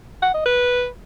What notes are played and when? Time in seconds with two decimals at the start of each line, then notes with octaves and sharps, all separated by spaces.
0.22 F#5
0.34 D#5
0.46 B4